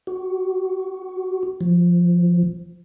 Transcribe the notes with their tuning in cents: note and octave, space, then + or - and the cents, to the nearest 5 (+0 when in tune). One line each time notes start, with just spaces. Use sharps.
F#4 +25
F3 +0